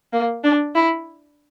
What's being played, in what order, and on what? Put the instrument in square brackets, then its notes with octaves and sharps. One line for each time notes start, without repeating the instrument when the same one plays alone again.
[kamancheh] A#3
D4
E4